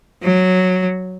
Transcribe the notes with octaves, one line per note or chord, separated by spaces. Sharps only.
F#3